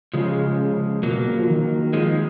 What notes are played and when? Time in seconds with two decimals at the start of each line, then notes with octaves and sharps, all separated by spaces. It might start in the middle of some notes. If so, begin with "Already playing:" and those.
0.13 C#3 F3 G#3
1.03 B2 F#3 A#3
1.15 B2
1.26 C#3
1.38 F3
1.48 D#3
1.93 F3 G#3